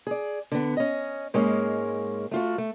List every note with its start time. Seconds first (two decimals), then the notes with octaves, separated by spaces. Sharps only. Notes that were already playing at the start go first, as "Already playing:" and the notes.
0.07 G#4 D5
0.52 D3 B3
0.77 C#4 D#5
1.34 G#2 G#3 A#3 C#4
2.31 A3 F4 F#4
2.58 A3